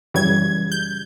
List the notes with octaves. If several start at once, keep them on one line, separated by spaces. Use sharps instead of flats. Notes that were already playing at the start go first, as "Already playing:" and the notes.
F#2 C#3 E3 G3 G#6
G6